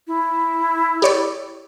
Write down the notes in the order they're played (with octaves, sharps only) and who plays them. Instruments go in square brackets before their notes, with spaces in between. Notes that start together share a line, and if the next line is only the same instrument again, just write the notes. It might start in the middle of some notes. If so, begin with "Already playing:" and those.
[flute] E4
[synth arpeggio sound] G4 C#5 D5